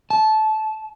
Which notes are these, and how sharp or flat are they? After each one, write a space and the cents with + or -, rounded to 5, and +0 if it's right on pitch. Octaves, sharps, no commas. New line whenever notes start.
A5 -20